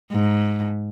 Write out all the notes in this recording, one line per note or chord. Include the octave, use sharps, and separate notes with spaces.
G#2